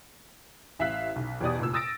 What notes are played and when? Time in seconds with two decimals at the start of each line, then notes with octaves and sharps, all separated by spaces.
0.79 A1 E5 F5 F#6 B6
1.16 B1
1.41 E2 B2 G4 D5 D#6
1.59 F1 A#2 E6
1.73 D#6 E6 A6 A#6 D7